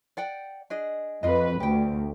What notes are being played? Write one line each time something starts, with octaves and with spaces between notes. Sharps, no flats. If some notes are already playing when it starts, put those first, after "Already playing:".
D5 F#5 G5
D4 G#4 D#5
F2 F4 B4 D#5
D2 G4 G5